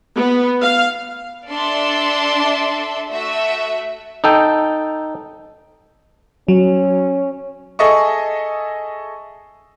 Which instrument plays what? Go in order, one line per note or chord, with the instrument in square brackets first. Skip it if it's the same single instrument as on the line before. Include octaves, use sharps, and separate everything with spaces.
[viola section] B3
F5
[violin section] D4 A4 D5 E5 A5 C6
A3 F#4 E5
[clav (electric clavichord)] D#4 A4 G5
[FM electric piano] F#3 [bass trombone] C#4
[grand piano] G#4 A4 D#5 E5 C#6